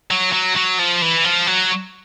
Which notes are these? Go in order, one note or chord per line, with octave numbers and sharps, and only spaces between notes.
F#3
F#3
F#3
F3
E3
F3
F#3